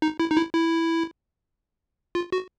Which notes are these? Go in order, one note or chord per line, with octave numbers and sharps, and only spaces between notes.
D#4
E4
D#4
E4
E4
F4
F#4